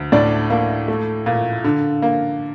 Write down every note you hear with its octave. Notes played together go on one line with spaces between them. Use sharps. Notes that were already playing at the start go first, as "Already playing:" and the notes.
Already playing: D2
A2 D4 D5
A#3
A3
A#2
D3
A#3